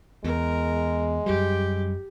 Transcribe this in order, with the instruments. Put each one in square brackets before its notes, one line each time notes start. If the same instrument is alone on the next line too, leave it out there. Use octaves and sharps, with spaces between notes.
[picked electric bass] E2 [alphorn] G#3 [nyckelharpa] A#4
[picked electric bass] F#2 G3 [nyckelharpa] G4